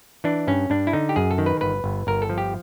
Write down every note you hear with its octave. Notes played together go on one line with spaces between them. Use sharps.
E3 D4
G2 C#4
G2 D4
E4
D3 D#4
G4
F#2 G#4
A4
D#3
B4
G1 B4
G1
G1 A#4
A4
F3
G4